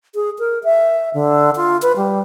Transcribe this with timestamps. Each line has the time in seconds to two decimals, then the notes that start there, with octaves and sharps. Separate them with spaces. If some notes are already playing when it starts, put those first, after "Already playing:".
0.15 G#4
0.39 A#4
0.64 E5
1.14 D3
1.56 F4
1.82 B4
1.97 G3